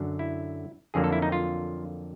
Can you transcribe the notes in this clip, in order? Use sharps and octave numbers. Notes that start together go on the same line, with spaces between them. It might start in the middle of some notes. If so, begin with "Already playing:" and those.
Already playing: F#2 D3 F#3
E4
F2 D3 F#3 A#3 G#4
A4
E4
D#4
F4